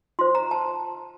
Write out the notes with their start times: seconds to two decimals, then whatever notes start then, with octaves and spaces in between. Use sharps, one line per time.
0.19 F4 C5 C6
0.35 A#5
0.51 A5